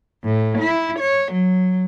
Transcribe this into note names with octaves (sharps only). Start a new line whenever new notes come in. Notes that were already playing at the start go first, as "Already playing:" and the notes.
A2
E4
C#5
F#3